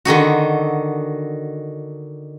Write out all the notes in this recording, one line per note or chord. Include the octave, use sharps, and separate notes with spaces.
D3 D#3 D#4 F#4